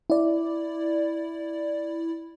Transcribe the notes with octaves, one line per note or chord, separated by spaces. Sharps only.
E4 D5